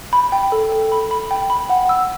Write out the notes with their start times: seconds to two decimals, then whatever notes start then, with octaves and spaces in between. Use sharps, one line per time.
0.13 B5
0.32 G5
0.52 A4
0.72 A4
0.92 B5
1.11 B5
1.31 G5
1.50 B5
1.69 F#5
1.89 E6